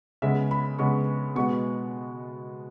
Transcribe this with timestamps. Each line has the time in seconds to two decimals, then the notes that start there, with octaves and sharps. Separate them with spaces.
0.22 C#3 G#3 B3 E5
0.51 B5
0.79 C#3 G#3 B3 C#6
1.35 B2 G#3 B3 C#6